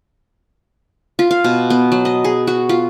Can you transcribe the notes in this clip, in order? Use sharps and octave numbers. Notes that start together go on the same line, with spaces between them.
F4
F5
B2
B3
F#3
D#5
G#4
F#4
F4